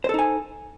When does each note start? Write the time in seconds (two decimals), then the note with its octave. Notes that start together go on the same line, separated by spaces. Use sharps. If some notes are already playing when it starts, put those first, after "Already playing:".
0.04 C5
0.09 A4
0.14 D#4
0.19 G#5